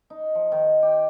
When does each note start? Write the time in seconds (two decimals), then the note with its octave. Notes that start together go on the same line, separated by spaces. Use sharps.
0.10 D#4
0.35 F3
0.52 D#3
0.82 G4